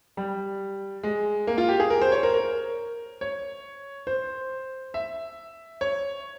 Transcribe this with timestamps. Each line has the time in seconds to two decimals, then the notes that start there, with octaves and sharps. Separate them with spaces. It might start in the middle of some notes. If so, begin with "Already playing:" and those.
0.17 G3
1.03 G#3
1.47 A#3
1.58 F4
1.69 G4
1.80 G#4
1.90 A#4
2.01 C5
2.12 C#5
2.23 A#4
2.34 A#4
3.21 C#5
4.07 C5
4.94 E5
5.81 C#5